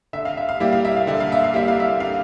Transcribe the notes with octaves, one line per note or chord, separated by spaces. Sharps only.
D3 E5
F5
E5
F5
G3 A#3 E4 G4 E5
F5
E5
F5
D3 E5
F5
E5
F5
G3 A#3 E4 G4 E5
F5
E5
D3 F5